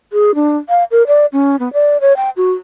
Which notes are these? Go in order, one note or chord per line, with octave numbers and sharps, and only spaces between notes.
G#4
D4
F5
A#4
D5
C#4
B3
D5
C#5
G5
F#4